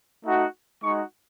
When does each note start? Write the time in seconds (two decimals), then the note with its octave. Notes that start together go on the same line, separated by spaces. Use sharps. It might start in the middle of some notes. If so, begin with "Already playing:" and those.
0.24 A3 D#4 F#4
0.82 G#3 D#4 F#4 C#6